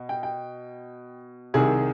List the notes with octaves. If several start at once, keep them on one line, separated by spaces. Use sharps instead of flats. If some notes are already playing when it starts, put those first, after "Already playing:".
Already playing: B2
G5
G5
C2 C3 D#3 G#4